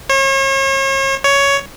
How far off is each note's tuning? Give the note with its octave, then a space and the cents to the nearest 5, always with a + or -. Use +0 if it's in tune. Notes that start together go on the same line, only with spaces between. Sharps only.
C#5 -40
C#5 +10